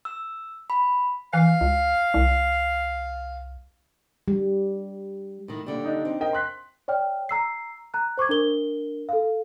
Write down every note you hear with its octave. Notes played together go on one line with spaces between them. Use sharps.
E6
B5
E3 F5
C#2
C2
G3
A2 D#3
D#2 D3 G3
D4 D#4
C4
A#4 D#5 G5
C6 F#6 B6
C#5 D5 G5 F6
A#5 E6 C7
A#5 F#6
C5 C#6 D6 G#6
D4 A#4 G7
A4 F5